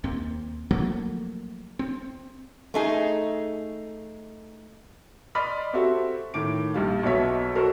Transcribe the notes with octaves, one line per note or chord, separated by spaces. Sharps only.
D#2 A#3 C4
F3 F#3 A3 A#3
C4
A3 D#4 G#4
D5 D#5 B5 C6 F6 B6
C4 F#4 G4 A4 E5
A2 D#3 D6 D7
A#1 G3 F5
B1 B2 F#3 C#5 E5 B6
F#4 A4 A#4 C5